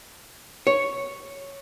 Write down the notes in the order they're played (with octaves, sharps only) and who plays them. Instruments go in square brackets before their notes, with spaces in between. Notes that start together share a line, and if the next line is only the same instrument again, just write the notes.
[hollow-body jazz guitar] C#5